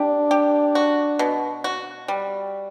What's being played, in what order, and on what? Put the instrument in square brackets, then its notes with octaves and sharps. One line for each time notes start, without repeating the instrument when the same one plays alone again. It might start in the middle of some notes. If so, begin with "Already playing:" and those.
Already playing: [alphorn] D4 [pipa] G4
[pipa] G4
F#4
B2
F#4
G3